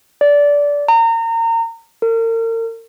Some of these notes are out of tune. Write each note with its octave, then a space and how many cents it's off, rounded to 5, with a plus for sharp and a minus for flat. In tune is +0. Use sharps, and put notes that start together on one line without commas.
D5 -20
A#5 -30
A#4 -40